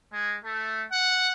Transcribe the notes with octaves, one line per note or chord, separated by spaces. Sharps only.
G#3
A3
F#5